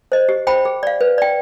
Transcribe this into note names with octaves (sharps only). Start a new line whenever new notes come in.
C5 D#5
G4
C5 G5 B5
G#4
D5 F5
B4
D5 G5